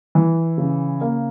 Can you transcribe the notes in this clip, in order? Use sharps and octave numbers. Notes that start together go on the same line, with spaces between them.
E3
C#3
A#3